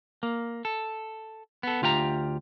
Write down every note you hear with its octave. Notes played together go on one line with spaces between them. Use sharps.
A#3
A4
B3 A4
D2 F4 G4 F#5 A#5